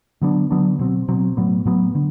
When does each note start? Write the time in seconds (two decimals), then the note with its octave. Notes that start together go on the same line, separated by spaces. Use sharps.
0.21 D3 F#3 B3 D4
0.51 D3 F#3 B3 D4
0.79 B2 F#3 C4
1.08 B2 F#3 C4
1.37 A2 F#3 B3
1.65 A2 F#3 B3
1.95 D3